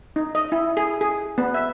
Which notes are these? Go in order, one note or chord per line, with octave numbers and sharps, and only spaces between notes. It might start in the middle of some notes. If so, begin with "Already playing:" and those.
D#4
D#5
E4
G#4
G#4
B3
E5